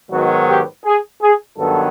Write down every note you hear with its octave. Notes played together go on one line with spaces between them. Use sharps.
G#2 D#3 F#3 B3 F#4
G4
G#4
G#4
G2 D#3 F#3 B3 A4